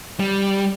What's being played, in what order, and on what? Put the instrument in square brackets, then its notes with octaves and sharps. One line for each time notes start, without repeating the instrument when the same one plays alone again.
[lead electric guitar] G3